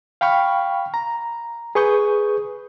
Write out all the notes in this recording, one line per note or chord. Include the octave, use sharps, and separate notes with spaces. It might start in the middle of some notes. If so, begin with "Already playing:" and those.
F5 G5 B5 C#6 F6
A#5
G#4 B4 C#6 D#6 G6